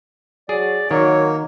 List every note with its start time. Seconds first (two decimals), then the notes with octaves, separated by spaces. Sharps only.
0.49 F#3 G#4 D5
0.91 D#3 F#3 A#3 C#5